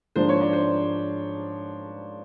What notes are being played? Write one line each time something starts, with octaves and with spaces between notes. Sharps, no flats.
G#2 F3 A#3 D4 C5
C#5
D5
C5